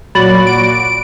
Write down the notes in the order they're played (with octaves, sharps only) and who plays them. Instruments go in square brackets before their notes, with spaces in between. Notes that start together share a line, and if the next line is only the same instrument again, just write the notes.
[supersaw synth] A#2 F#4 D5 [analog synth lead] F#3 [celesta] B5 A6 F#7
[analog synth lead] D7